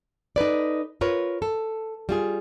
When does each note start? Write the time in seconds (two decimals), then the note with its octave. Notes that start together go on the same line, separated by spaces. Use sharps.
0.36 D#4 A4 B4 D5
1.01 F4 A#4 B4 C#5
1.42 A4
2.09 G3 F4 G#4